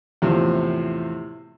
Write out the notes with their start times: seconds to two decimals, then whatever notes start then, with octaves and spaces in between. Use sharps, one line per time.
0.22 E2 A2 C3 F3